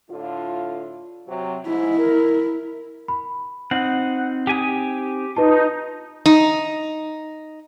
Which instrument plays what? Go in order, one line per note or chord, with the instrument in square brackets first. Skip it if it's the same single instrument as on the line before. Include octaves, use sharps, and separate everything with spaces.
[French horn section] A2 D3 F4
C3 F#3
[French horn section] G#2 [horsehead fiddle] E4
[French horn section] A#4
[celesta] B5
[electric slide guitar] C4 D#4 [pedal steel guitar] F#5
[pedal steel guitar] G4 G#5 D#6
[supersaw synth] D#4 [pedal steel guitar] F4 [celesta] B4 A5
[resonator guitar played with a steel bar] D#4